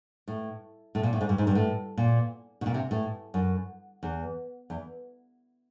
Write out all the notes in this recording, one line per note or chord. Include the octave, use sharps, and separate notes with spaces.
A2
A2
A#2
A2
G#2
G2
G#2
G2
A2
A#2
B2
A#2
C3
A2
F#2
E2
E2